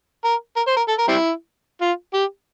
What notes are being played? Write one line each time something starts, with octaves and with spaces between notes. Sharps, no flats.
A#4
A#4
C5
A#4
A4
A#4
G3 C4 E4
F4
G4